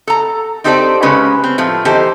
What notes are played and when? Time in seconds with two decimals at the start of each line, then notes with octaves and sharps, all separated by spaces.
0.07 A4 A#5
0.64 C4 D#4 G4 A4 C5 D5
1.02 C#3 G#3 C#4 B4
1.44 C4
1.58 A2 F3 A3
1.85 E3 D#4 G4 A4 C5